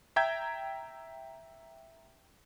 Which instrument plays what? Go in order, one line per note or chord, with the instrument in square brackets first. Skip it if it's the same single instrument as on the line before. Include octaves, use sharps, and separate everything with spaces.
[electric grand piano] E5 G5 A#5 G6 G#6